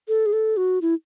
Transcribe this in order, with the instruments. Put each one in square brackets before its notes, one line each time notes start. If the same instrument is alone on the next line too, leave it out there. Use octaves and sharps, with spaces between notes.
[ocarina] A4
G#4
A4
F#4
E4